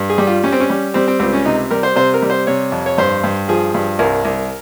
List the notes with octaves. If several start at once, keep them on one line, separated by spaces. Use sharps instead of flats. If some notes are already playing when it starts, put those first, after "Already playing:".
Already playing: G2
G#4
G3
F4
G3 C#4
C4
C#4
G3
G3 C4
C4
C#2 C4
C#4
C3 D#4
G3 A#4
C5
C3 C5
A#4
G3
C5
C3 C#5
F2
C#5
G2 C5
G2
F3 G#4
G2
C2 A#4
C2